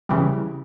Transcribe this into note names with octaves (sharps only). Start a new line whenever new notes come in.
C#3 E3 G3